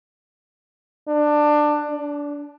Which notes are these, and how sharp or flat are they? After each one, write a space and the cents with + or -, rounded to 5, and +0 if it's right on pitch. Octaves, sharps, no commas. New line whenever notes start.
D4 +20
D4 -20